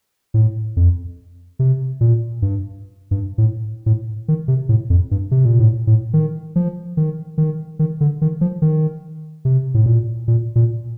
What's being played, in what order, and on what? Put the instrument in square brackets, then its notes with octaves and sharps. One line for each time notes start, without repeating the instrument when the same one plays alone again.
[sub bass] A2
F2
C3
A#2
G2
G2
A2
A2
D#3
C3
A2
F2
G2
C3
A#2
A2
A2
D#3
F3
D#3
D#3
D#3
D3
D#3
F3
D#3
C3
A2
A#2
A#2
A#2